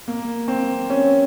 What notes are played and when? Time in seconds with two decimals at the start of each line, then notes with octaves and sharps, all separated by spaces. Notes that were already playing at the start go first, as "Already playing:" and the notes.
0.08 A#3
0.48 C4
0.90 C#4